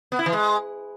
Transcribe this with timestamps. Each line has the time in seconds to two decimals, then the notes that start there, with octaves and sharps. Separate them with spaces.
0.12 B3
0.19 E4
0.26 E3
0.33 G#3